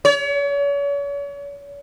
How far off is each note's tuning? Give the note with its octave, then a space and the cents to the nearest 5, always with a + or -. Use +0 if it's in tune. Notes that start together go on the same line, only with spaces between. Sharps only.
C#5 +40